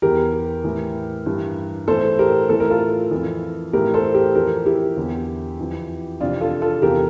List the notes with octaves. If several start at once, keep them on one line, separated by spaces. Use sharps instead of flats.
E2 E3 G4 A#4
A2 E3
G2 E3
A2 E3 A4 C5
G4 A#4
A2 E3 A4
A#4
F4 A4
F2 E3
A2 E3 G4 A#4
A4 C5
G4 A#4
F2 E3 G4 A#4
E4 G4
E2 D3
F2 E3
F2 C3 E3 D4 F4
F4 A4
F4 A4
E2 C3 E3 G4 A#4